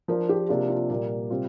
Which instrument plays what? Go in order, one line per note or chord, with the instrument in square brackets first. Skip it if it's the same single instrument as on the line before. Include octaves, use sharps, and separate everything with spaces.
[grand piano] F3 D4 F4 [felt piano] A#4
[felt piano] G4
[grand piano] C3 A#3 D4 F4 [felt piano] G4
[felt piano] F4
[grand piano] A#2 G3 A#3 [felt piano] D5
[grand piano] C3 G3 C4 F4